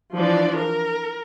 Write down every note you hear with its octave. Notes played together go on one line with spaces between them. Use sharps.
E3 F3 D4 D5
A#4